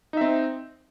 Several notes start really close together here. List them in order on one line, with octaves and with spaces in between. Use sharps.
D#4 E5 C4